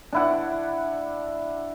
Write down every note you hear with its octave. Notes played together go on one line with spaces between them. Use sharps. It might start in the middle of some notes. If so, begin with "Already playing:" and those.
D4 E4 F#5